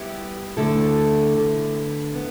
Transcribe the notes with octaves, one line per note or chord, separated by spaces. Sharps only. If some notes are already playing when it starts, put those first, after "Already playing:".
Already playing: G3 B3 E4 G4
D3 A3 E4 A4
D3 B3 E4
B3